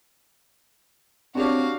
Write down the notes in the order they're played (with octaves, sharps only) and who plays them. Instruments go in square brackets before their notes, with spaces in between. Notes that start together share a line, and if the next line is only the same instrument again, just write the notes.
[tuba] C4 [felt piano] D4 G4 [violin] F#4 F5 [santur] C#5 D5 C#6